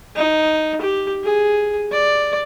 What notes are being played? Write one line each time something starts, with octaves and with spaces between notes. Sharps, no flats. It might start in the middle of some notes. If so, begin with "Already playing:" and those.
D#4
G4
G#4
D5